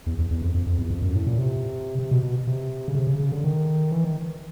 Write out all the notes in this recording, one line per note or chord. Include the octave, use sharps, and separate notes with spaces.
E2
E2
E2
F2
F2
F2
E2
F2
F#2
A2
A#2
C3
C3
B2
B2
C3
C#3
C3
C#3
C#3
D3
D#3
E3
D#3